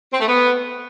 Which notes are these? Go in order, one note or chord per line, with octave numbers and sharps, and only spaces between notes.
C4
A3
B3